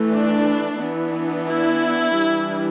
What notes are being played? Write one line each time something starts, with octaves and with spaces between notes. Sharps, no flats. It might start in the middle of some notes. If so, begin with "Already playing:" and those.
Already playing: E3 A3
D4
E3 B3 D4
E4
E3 G3 D4